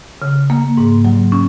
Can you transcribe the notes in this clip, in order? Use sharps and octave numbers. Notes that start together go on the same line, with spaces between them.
C#3
A#3
G#2
F#3
C#4